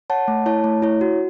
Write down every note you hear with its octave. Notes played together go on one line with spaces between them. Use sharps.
C#5 F#5 A5
A3
E4 C#5 A5
A3
E4 C#5
F#4